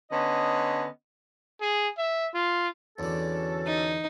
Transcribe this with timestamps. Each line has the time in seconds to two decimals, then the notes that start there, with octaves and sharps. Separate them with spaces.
0.11 D3 B3 C#4 D#5
1.61 G#4
1.98 E5
2.34 F4
2.99 E2 D3 C#4 F#4 A4
3.66 D#4